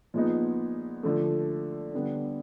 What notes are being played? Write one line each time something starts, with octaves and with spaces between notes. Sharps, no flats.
A#2 F3 G#3 B3 D#4
D3 F3 A3
D3 G3 B3 D4